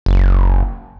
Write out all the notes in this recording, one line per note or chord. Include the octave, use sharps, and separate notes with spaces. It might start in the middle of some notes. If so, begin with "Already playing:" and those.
F#1